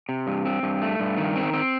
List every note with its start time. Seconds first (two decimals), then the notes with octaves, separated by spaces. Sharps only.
0.09 C3
0.27 G2
0.45 C4
0.63 G2
0.82 A3
1.00 G2
1.17 D#3
1.36 C4
1.53 C4